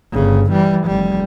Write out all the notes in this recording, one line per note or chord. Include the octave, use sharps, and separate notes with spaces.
G1 C#3
E3 G3
F1 G3